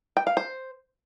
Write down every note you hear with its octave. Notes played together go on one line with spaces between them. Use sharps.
G5
F5
C5